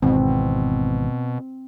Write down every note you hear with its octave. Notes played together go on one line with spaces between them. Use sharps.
G#1 E2 B2 C4